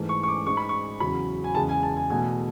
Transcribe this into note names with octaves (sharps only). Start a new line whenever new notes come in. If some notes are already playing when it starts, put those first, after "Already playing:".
Already playing: G#2 E3 A3
C#6
C#6
D6
G#2 G#3 C#6
B5
C#6
E2 C#3 F#3 B5
G#5
E2 C#3 G#3 A5
G#5
A5
G#5
E2 B2 A3 G#5